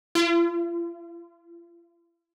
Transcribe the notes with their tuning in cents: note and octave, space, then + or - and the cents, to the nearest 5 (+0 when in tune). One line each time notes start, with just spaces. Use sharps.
F4 -40